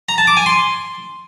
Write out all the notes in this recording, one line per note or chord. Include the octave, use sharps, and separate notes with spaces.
A#5
A5
D6
G#5
C6